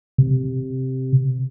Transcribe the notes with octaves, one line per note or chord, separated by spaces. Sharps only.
C3